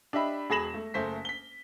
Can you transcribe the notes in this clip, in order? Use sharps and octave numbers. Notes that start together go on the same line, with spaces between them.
D4 G4 D#5 E5 B5
E1 G#4 B5 A#6 E7 F#7
A3
F#1 A3 C5 B6
B6 G7